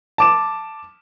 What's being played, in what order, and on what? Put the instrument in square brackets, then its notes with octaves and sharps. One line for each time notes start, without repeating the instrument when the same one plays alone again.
[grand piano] A5 D6 E7